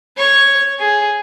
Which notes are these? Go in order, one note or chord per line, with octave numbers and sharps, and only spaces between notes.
C#5 C#6
G#4